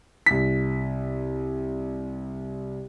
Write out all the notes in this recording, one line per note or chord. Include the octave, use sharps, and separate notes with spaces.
C2 B6